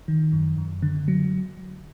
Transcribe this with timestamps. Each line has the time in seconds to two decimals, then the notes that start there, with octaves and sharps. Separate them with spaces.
0.08 D#3
0.33 F#2
0.58 F#2
0.82 D3
1.08 F#3